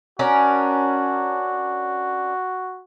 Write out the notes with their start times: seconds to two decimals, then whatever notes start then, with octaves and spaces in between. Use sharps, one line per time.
0.19 C#4 D4 F#4 A#4